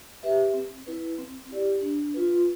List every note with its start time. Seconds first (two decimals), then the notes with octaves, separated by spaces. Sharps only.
0.23 G4 B4 E5
0.54 C4
0.87 E4 B4
1.18 C4
1.49 E4 G4 D5
1.81 D4
2.14 F4 B4